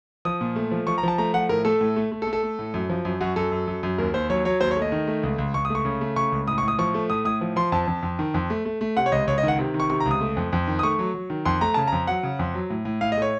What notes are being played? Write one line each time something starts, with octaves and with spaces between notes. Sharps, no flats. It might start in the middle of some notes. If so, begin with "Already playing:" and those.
F3 D#6
A#2
A3
F3
F3 C#6
A#5
F3 A5
A3 A#5
F3 F#5
A2 A#4
A3 A4
A2
A3
A3
A4
A3
A4
A3
A2
F#2
F3
F#2
F#2 F#4
F#2 A4
F#2
F#2
F#2
D#2 A#4
D#2 C5
F#3 C#5
F#3 C#5
D#2 C5
C#5
A3
D#5
D#3
A3
C#2
C#2
C#2 C#6
D#6
A3
C#6
C#3
A3
C#3 C#6
C#2
A2 D#6
C#6
A2 D#6
F3 C#6
A3
A2 D#6
A2 D#6
F3
F3 C6
F2 A5
F2
F2
D#3
F2
A3
A3
A3
C3 F#5
C#5
C#2 D#5
C#2 C#5
D#5
D#3 F#5
C3
D#3
C#6
C3 C#6
A#5
C#2
D#6
A3
F2
F2
D#3
D#6
A3 C#6
F#3
F#3
D#3
F2 C6
A3 A#5
C#3 A5
F2 A#5
F#3 F#5
C#3
F2
F#3
A2
A2
A2 F5
D#5
A3 C#5